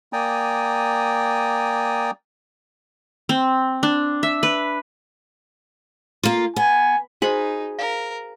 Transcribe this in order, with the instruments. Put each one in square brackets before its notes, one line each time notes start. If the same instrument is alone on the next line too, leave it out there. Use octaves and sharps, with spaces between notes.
[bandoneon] A#3 D5 G5 G#5 A#5 D#6
[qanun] C4
D4
E5
B4
[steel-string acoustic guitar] A#3 F4
[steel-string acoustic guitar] B3 [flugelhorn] G#5
[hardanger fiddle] D#4 [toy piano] F#4 C5 D#5 [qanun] G#4 B5
[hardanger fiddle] A#4 [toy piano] F5